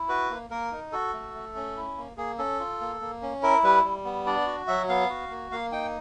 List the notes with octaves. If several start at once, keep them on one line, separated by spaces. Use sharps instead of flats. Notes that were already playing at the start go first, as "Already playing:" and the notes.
Already playing: E4
F#4 B4
A#3
A#3 A#4
D#4
F#4 A4
A3
A3
C#4
E4
A#3
A#3 G#4
C#4 A4
F4
A#3
A#3
C#4
E4 A#4
G3 B4
G3
B3
D4 D5
F#4
F#3 E5
B3 F5
F#4
A#3
A#3 F5
D#4 G5